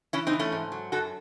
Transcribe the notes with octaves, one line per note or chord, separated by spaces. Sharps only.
E3 C#4 E4
C4 D#4
E3
A3 C#4
G#2
F#3
F#2 F#4 A4